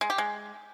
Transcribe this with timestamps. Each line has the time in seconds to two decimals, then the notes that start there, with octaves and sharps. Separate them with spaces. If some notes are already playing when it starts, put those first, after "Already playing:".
0.01 G#3
0.10 G4
0.18 G#3